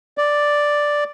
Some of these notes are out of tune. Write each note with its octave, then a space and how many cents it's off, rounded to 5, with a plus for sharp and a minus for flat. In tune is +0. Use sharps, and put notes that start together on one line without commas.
D5 +0